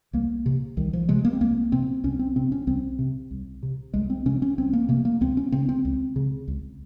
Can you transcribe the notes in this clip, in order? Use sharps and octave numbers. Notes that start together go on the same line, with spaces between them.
C2 A#3
C3
C2 D#3
F3
C3 G#3
A#3
C4
C2 A#3
C3 C4
C2 C#4
C4
C3 C4
C#4
C2 C4
C3
C2
C3
C2 G#3
C4
C3 C#4
C#4
C2 C4
A#3
C3 A#3
A#3
C#2 C4
C#4
C#3 C4
C4
C#2
C#3
C#2